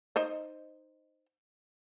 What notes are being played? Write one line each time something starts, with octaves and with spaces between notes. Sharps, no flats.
D#4 C5 D#5